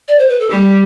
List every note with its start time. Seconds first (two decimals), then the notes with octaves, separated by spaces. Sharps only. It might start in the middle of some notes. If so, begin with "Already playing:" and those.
0.08 D5
0.18 C5
0.29 B4
0.40 A4
0.50 G3 G4